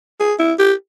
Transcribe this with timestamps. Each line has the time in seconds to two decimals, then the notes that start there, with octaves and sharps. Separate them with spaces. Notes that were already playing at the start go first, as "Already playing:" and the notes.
0.20 G#4
0.39 E4
0.59 G4